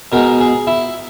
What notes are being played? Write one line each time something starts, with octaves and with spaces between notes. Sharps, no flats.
B2 G#3 D#4 A#4
G#4
E4